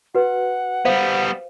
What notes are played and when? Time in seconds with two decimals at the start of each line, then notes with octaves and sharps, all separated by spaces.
0.15 F#4 B4 F#5
0.85 G3 B3 C5 F5